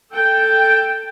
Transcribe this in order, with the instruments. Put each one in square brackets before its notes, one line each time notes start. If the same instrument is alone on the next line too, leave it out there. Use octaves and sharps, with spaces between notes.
[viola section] A4 G5